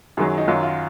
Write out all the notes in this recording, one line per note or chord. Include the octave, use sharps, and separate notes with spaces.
F#2 D#3 F#3 G#4
D#4
F#2 D#3 F#3 F4
F4